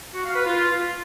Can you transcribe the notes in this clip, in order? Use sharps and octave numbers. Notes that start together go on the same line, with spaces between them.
F#4
F5
B4
F4